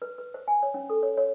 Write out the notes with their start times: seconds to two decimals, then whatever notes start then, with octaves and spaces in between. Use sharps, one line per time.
0.02 B4
0.18 B4
0.34 C5
0.48 G#5
0.63 C#5
0.74 C#4
0.90 A4
1.03 C#5
1.18 C#5